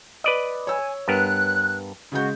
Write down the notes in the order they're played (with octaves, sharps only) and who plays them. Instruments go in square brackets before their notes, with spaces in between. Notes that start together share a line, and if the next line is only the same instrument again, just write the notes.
[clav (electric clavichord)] B4 D5 D#5
[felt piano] C#5 E6 [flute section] G#5
[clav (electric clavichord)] G2 B3 A#4 [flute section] F#6
[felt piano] C#3 G#3 G6 [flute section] F#4